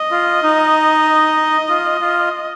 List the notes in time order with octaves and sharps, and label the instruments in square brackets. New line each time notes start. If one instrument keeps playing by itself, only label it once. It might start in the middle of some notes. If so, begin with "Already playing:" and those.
Already playing: [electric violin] D#5
[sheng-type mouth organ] F4
D#4
F4
F4